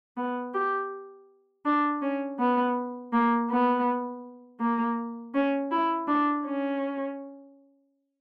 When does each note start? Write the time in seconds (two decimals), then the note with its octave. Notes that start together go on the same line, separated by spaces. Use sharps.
0.17 B3
0.54 G4
1.65 D4
2.02 C#4
2.39 B3
3.13 A#3
3.50 B3
4.60 A#3
5.34 C#4
5.71 E4
6.08 D4
6.45 C#4